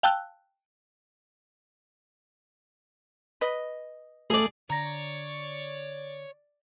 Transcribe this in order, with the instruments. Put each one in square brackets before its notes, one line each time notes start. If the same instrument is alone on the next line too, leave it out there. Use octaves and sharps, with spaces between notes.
[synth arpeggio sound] F5 G5 A5 E6 F#6
[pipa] B4 D#5
[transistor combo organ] A3 [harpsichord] G#4 D5
[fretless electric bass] D3 [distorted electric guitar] C#5 [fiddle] D5 [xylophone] A#5 A#6